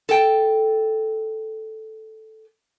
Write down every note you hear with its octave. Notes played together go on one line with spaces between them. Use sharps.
A4 G5